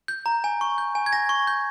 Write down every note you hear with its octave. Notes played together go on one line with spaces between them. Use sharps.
G6
A#5
G#5
C#6
G6
G#5
G#6
G#5 A#6
C#6
G6